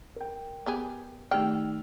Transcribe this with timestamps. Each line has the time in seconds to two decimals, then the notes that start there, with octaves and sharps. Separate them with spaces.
0.16 A#4 G5
0.66 B3 G4 G#4
1.31 D#3 A3 G4 D5 G5 E6 F6